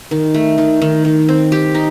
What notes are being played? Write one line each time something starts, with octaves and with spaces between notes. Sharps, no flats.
D#3
A3
D#3
D#3
D#3
C4
G4
D#4